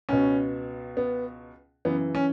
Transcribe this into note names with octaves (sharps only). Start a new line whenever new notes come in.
C#2 B2 C#4
B3
F#2 C#3 E3 B3
C#4